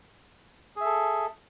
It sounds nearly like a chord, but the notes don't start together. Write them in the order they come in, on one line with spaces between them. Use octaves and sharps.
G#4 E5 A4